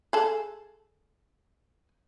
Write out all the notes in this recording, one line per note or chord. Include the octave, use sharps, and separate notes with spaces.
G#4 A4